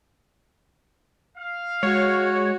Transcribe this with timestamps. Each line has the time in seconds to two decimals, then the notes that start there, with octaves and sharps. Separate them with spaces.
1.38 F5
1.83 G#3 F#4 C#5